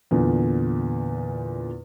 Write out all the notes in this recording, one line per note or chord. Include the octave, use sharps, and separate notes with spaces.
E2 A#2 D3